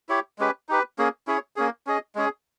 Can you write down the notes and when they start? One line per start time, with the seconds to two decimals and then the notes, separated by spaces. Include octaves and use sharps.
0.09 E4 G4 C#5
0.38 G#3 C#4 G4 B4
0.69 D#4 G4 B4
0.98 A#3 C#4 G#4
1.27 C#4 E4 G#4 C#5
1.56 A#3 C#4 G#4
1.87 C#4 G#4 D#5
2.15 G#3 C#4 G#4